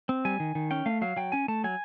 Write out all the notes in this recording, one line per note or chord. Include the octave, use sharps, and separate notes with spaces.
C4
G3 G#5
D#3
D#3
C#4 G5
A3 F5
F#3 F5
F#3 G5
C#4 G#5
A3 A5
F#3 G#5